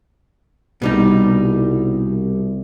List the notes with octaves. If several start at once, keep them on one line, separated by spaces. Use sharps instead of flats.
C2 B2 G3 D#4